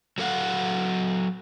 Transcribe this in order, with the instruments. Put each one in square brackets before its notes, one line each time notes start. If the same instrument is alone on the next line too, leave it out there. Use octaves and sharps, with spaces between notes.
[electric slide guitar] F#3 A4 F5 F#5